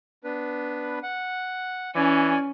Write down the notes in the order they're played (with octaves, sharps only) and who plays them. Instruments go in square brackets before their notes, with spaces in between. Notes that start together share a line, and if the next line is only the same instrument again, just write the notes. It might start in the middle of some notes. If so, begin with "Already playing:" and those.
[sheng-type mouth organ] B3 D4 B4
F#5
[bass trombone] E3 [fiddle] C#4 [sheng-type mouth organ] D5 G#5